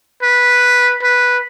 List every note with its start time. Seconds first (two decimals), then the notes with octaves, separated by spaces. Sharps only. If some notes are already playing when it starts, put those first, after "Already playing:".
0.23 B4
1.03 B4